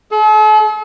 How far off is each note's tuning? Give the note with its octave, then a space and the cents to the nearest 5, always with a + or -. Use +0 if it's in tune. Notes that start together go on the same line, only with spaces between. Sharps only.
A4 -45